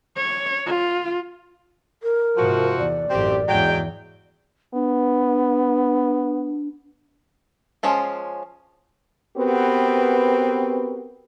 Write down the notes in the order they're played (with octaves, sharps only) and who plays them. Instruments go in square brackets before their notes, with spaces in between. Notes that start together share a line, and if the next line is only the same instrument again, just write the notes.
[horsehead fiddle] C#5
F4
[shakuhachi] A#4
[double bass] G#2 C3 [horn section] F3 F#4
[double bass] E2 [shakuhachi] D5
[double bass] A1 F#2 [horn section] C4 G4
[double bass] E2 G#2 [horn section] F#3 G#3 G5
[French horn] B3 [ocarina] D4
[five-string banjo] F3 G#3 C#4 F4
[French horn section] B3 C4 F#4 G4 A#4 B4